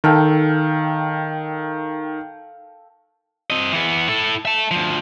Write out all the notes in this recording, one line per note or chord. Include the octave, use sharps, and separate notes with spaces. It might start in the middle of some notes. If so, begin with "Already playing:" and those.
D#3 A4 F5 G5
C4 D#5
E3 B3
E4 A4
E5 A5
D2 F3